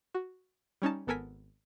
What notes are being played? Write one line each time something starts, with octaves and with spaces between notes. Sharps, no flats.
F#4
G3 C#4 D#4 A5
G#1 B3 A4 A#4 G#5 B6